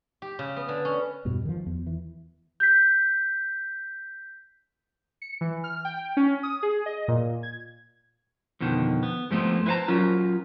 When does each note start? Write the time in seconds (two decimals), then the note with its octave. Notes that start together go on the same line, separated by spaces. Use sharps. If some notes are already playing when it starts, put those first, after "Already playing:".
0.22 G4
0.39 C#3
0.56 B3
0.68 D3
0.85 C#4
1.25 E2 G2 B2
1.45 D#3 F3
1.66 E2
1.87 E3
2.60 G6 B6
5.22 C#7
5.41 E3
5.64 F6
5.85 G5
6.17 C#4
6.43 D#6
6.63 G#4
6.86 D#5
7.08 A#2
7.43 G#6
8.60 F2 B2 D3 D#3
9.03 B3
9.31 G#2 F3 A3 B3 C4
9.66 E4 B4 C5 F5 A5 A#5
9.88 F#3 C#4 F4 A#4